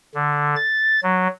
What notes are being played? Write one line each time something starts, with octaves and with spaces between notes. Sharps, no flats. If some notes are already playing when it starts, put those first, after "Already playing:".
D3
A6
F#3